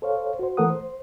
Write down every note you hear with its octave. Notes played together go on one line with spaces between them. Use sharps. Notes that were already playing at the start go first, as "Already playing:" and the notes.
A4 C5 C#5 F5
F#4 C5
E3 A3 A4 A#4 F#5 D#6
C5